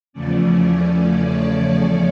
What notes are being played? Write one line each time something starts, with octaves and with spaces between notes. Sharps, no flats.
E2 C#3 F3 A3 C#4 D5
C#5